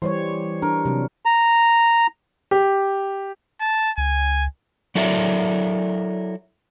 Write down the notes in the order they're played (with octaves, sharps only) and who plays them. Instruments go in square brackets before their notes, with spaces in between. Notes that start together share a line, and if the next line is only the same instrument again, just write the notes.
[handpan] E3 G3 C#5 [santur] C5
[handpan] D4 [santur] A#4
[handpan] C3 F#3
[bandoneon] A#5
[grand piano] G4
[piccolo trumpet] A5
[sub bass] C#2 [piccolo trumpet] G#5
[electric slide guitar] F#3 E4 A4 A#4 D5 E5